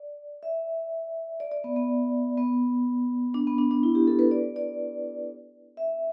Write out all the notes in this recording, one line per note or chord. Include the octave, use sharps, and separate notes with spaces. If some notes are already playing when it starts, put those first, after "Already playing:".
Already playing: D5
E5
D5
D5
B3
B3
B3
D4
B3
D4
D4
E4
G4
A4
B4
D5
D5
E5